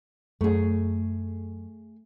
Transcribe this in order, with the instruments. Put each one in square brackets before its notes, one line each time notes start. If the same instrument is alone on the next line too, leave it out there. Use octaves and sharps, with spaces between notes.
[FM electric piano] F#2 [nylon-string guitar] A3 G#4